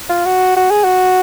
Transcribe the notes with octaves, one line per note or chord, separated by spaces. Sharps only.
F4
F#4
F#4
G#4
F#4